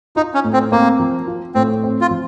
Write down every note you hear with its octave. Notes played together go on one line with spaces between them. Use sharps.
D#4 F4
C#4
A2
C4
A#3 C4
F3
F4
A2 C4
C4
F4
F3